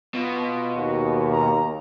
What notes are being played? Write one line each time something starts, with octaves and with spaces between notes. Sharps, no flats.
B2 F4
D#2 F#4
A#5